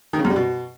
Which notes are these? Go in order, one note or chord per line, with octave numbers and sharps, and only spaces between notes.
D#3
C#3
F#2
G3
B2